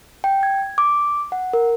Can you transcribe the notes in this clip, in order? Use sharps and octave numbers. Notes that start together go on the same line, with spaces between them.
G5
G#6
D6
F#5
A#4